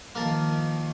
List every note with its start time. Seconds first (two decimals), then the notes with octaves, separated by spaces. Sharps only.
0.15 D#3 F3 A#3 A#4 A5